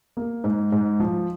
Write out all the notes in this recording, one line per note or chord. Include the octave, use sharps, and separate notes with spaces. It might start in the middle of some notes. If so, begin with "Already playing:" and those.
A#3
G#2
G#2
F3